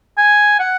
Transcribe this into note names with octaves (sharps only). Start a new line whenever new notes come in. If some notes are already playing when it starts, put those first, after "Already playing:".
G#5
F#5